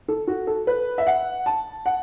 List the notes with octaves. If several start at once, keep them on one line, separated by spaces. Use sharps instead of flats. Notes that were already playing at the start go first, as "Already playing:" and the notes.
A4
F#4
A4
B4
E5
F#5
A5
F#5